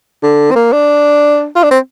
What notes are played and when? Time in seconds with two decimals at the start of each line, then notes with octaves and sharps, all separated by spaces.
0.23 D3
0.51 C4
0.56 A#3
0.72 D4
1.56 F4
1.63 D4
1.71 C4